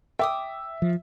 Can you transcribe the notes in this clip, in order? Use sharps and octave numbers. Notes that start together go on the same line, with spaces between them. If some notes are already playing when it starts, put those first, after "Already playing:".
E5 G5 D6 D#6
F3